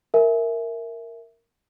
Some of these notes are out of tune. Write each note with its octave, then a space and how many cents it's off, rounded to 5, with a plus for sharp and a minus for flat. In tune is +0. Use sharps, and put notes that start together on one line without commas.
A#4 -10 E5 +0 G#5 +20